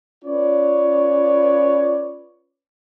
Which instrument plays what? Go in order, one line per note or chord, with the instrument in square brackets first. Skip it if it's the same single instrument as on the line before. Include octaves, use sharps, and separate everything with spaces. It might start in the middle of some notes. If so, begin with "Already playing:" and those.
[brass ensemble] C#4 F4 B4 C#5 D5